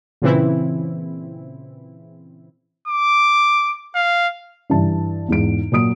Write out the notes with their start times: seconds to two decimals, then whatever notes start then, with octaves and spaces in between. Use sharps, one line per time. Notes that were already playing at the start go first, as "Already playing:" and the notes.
0.22 A#2 C#3 E3 C4 E4
2.88 D6
3.95 F5
4.70 G2 E3 A5
5.28 E2 G#2 D7
5.72 A#2 F#3 D#6 D7